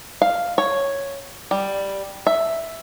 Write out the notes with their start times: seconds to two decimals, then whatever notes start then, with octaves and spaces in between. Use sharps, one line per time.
0.22 F5
0.58 C#5
1.51 G3
2.27 E5